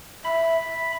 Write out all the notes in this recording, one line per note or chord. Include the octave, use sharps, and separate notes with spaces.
E5 B5